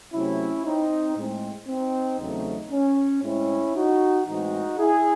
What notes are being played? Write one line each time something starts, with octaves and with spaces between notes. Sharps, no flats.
C3 F#3 A3 C4 C#4 E4
C4 D#4
A2 G#3 C4
C4 D#4
E2 C#3 F#3 A3 C4
C#4
A2 G#3 C4 C#4 E4
D#4 F#4
A2 E3 G#3 C4 D#4 F#4
E4 G#4